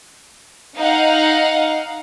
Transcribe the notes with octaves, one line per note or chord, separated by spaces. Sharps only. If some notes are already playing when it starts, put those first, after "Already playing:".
D#4 F5 F#5